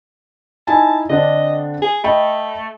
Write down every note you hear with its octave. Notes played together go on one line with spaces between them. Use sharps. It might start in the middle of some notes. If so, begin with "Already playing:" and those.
D#4 E4 G#5 A5
D3 C4 D4 D#5
G#4
A3 D#5 G5 B5